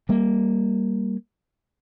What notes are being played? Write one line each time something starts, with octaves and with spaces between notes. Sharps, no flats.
G3 A#3